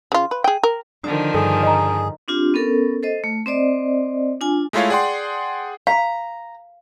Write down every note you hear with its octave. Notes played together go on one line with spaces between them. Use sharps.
C#3 F4
B4
G#4 G5
A#4
D3 D#3 F3 D4 D#6
G2 G#4 A4 D#6
D#5 A#5
C4 D4 F4 G4
B3 C#4 A4 A#4
A4 C5 D#5
A3
C4 C5 D5 D#5
D4 F4 G#5
G#3 A3 E4 F4 C#5 F5
G#4 D5 F#5 G5 C6
F5 A#5